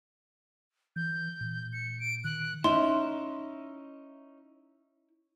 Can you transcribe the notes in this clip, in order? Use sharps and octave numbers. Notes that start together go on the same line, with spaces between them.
E3 G6
A#2
C#7
D7
D#3 F#6
C#4 D#4 E4 C6